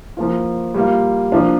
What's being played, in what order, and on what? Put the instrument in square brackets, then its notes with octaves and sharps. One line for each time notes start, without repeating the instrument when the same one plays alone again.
[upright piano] F3 A#3 F4
G3 A#3 F4
F3 A#3 D4 F4